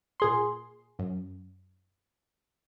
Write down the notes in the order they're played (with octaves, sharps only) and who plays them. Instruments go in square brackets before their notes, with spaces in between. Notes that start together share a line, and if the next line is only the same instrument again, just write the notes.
[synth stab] A#2 G#4 C6
F#2